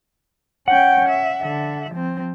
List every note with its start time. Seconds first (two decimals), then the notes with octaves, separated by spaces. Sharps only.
0.68 C#4 F#5 G5
1.09 E5
1.43 D3 E5
1.92 F3 C4